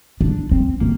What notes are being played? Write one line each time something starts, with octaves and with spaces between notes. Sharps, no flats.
D4
C4
A#3